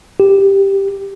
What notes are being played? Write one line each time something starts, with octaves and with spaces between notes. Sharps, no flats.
G4